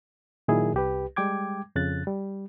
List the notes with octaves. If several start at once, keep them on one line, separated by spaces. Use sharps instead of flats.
A#2 D#3 F#3 E4 G#4
C2 G4 B4
G3 G#3 G5 D6 G#6
F2 C#3 F#6 A6
G3